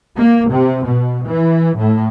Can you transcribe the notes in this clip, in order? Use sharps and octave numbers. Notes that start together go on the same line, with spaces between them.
A#3
C3
B2
E3
A2